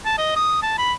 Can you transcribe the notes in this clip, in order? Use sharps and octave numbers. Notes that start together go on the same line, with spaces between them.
A5
D#5
D#6
A5
B5